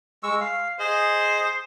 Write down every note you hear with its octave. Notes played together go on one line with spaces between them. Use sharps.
G#3 C#6 E6
F5
G#4 C5 D#5